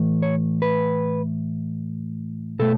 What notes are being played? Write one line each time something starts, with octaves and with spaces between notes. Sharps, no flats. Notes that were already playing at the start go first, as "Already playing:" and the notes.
Already playing: A2 E3 A3
C#5
B4
B2 A3 A4